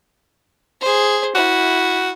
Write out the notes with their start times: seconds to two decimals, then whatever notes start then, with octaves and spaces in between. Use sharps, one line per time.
0.81 G#4 C5
1.35 E4 F#4